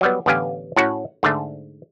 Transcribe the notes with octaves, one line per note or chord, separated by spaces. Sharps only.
F#3 G3 B3
A1 D3 B3 G4 F5 G#5
A2 C#4 F#4 F#5
G#2 D3 A3